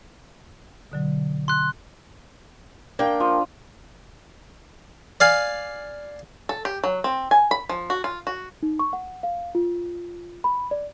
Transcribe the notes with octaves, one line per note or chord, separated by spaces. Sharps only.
B2 D3 F#3
C6 F#6
A#3 D4 G5
F3
D5 F5 G#5
A4
G4
F#3
C4
G#5
B5
F3
F#4
F4
F#4
D#4
C#6
F#5
F5
F4
B5
D5